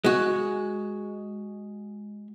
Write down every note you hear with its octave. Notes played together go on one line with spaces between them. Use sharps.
G#3 F#4